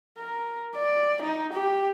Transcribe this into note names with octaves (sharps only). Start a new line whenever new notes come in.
A#4
D5
D#4
G4